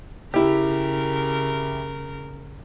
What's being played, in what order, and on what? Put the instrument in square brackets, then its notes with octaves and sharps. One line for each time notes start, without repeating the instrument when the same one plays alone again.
[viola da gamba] C#3 A#4 [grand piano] E4 G4